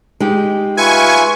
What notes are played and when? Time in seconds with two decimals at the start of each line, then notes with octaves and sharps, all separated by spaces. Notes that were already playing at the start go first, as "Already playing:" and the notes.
0.20 G#3 D#4 G4
0.77 F4 B4 E5 G#5 C#6